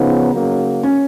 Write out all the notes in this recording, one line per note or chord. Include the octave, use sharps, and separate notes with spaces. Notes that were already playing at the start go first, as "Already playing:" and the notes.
Already playing: C#3 F3 B3 D#4
C#3 F#3 A#3
C#4